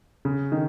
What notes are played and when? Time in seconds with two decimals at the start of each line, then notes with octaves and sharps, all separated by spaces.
0.25 C#3
0.52 D#3